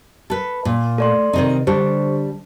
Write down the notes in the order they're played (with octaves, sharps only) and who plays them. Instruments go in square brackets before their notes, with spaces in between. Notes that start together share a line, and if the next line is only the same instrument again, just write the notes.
[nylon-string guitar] A4 B4
A#2
[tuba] A3 [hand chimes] A4 D5 C6
[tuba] C3 [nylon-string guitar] D#3 C4 D#4
[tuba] D3 [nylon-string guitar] G3 D4 [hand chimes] G4 C5